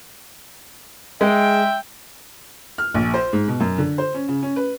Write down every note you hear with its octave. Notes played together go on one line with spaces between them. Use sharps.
G#3 E5 G5
F6
A#1
C5
G#2
B2
F#2
D3
C5
C#4
C#3
C#4
B4